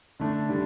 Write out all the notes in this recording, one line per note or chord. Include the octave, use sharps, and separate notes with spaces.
D3 A3 D4
D3 G3 D4